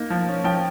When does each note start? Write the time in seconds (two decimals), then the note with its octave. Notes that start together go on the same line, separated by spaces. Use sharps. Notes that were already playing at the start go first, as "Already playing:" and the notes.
Already playing: A#3 D#4
0.10 F3
0.28 C#4
0.44 F3 G5